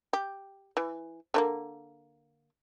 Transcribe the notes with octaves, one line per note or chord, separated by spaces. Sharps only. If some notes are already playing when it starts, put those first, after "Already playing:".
G4
E3
D3 F3 A#3